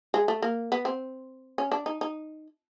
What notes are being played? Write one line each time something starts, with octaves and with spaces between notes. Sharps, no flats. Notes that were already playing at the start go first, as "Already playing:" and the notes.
G#3
A3
A#3
B3
C4
C#4
D4
D#4
D#4